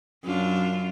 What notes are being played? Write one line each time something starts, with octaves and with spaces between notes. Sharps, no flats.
F#2 D4 F4